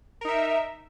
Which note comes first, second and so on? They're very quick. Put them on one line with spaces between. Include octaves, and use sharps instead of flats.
A#4 D#4 E5